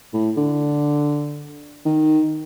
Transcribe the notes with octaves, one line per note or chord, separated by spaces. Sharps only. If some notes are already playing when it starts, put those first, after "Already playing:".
A2
D3
D#3